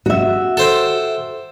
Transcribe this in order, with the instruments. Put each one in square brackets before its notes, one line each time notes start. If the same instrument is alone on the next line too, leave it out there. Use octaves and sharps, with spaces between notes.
[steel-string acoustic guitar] F#4 E5
[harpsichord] A4 C5 G5